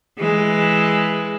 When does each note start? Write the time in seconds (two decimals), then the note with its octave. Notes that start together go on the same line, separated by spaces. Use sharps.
0.18 E3 G#3